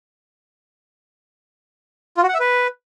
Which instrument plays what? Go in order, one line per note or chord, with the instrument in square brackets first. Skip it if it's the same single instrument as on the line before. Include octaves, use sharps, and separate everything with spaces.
[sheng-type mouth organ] F4
F#4
F#5
E5
B4